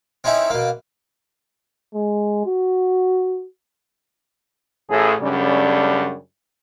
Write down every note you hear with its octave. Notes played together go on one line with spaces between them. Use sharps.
C4 C#4 D#4 E4 E5
B2 A#3
G#3
F#4
A1 A2 G#4
F#2 C#3 G3 A3 C#4 D4